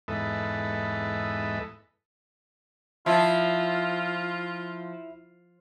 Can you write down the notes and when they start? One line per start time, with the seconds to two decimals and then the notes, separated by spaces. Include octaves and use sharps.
0.08 E2 G#2 A4 B4 D#5 E5
3.06 F3 E4 F4 E5